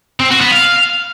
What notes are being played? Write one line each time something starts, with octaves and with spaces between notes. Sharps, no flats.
C4
F#4
B3
F5